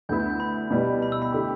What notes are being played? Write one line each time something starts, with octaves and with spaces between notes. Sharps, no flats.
D2 D3 B3 E4 G6
G6
G6
B5
B2 G3 E4 B4
B5
E6
B5
D3 A3 E4 G4